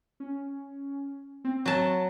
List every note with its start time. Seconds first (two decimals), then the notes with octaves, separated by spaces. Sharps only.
0.20 C#4
1.44 C4
1.66 F#3 A5